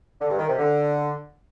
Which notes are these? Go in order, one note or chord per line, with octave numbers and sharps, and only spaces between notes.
D3
G2
D#3
C3
D3